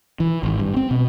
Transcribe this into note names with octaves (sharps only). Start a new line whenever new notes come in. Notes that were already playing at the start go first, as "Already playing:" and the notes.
E3
G#1
G2
C4
B2